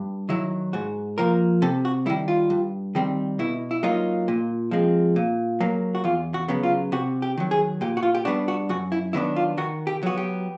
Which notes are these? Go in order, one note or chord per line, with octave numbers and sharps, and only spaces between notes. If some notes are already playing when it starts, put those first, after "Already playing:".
Already playing: G2
D#3 F#3 E4
G#2 F#4
F3 A#3 A#4
C3 A4
F#4
D#3 G3 E4
F4
G2
D#3 G3 C4
B2 E4
E4
F#3 A#3 D#4 F4
A#2
F3 G#3 C4
A#2
F#3 A#3
F#4
E2 F4
F#4
C#3 F#3 B3
F4
C3 F#4
G4
D#3 F#3
G#4
A#2 G4
F#4
F4
G4
G3 B3 D4 F#4
F#4
F#2 F#4
E4
D#3 F#3 B3 D4 E4
F4
D#3 F#4
G4
F#3 B3 F#4
G4